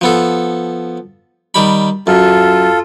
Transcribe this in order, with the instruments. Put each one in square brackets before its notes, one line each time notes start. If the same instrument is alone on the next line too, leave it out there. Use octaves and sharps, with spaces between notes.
[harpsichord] F3 B3 A4
D#3 G3 B5
[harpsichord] F#2 [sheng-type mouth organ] F4 A4